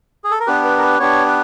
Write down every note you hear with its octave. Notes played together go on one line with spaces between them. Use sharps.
G#4
A4
A#4
B3 D4 G4 B4
B4
A#4
B4
B3 D4 G4 C#5
B4